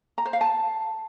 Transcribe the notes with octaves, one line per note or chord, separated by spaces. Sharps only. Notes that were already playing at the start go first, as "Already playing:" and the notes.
A#5
C5
F5
A5